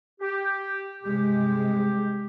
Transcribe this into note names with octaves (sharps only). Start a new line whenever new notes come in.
G4
G2 C3 G#3 G4